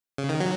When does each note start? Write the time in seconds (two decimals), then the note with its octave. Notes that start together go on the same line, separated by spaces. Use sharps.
0.18 C#3
0.29 D#3
0.40 F#3